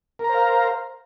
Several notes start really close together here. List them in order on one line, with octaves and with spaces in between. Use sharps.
A#4 A#5 C5 F5